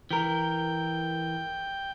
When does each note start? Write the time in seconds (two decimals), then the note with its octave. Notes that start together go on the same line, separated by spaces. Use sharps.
0.11 E3 A#4 G5